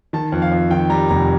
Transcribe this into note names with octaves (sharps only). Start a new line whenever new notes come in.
D#3 A5
F2
F5
F2
D#3 G5
G3 A#5
F1 A#5